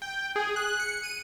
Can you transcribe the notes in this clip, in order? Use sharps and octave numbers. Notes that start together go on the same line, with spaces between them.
G5
G#4
F#6
C#7
D#7